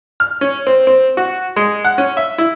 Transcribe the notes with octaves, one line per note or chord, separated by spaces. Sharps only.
F6
C#4
C4
C4
F#4
G#3
F#5
C#4
E5
E4